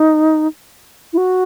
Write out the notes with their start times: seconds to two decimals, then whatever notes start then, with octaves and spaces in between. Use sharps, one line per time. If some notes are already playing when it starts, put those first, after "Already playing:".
Already playing: D#4
1.13 E4
1.17 F#4